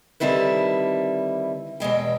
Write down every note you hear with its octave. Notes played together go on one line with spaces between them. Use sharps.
D3 D#3 G3 C4 E4 B4
E2 B2 G#3 G5